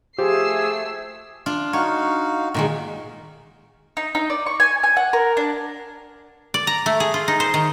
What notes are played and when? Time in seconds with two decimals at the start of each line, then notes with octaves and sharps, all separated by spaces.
0.18 F3 A3 G4 G#4 E6 C7
1.46 D4 F4
1.73 D#4 F#4 C#5 F5
2.54 A#2 D#3 G#3
3.97 D#4
4.15 D#4
4.30 D5
4.46 C#6
4.60 G#5
4.83 G#5
4.97 F#5
5.13 A#4
5.37 D4
6.54 D5
6.67 A#5
6.86 A3
7.00 G#4
7.14 F4
7.28 D#4
7.40 C5
7.54 D#3